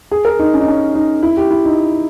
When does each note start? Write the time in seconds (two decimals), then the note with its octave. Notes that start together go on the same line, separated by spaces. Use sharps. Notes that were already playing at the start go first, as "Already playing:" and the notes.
0.11 G#4
0.25 A#4
0.39 D#4
0.54 C#4
0.61 D#4
0.68 C#4
0.95 D#4
1.23 E4
1.37 G4
1.51 E4
1.65 D#4